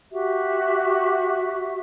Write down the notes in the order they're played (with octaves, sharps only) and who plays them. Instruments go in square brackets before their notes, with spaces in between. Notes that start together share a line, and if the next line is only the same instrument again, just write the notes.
[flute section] F#4 G4 E5